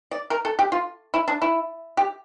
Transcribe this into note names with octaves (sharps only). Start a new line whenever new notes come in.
D5
A#4
A4
G4
F4
E4
D4
E4
G4